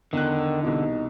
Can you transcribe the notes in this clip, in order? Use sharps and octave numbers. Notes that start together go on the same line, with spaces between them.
E2 D3 D#3 F#6
C2 B2 E3 D#4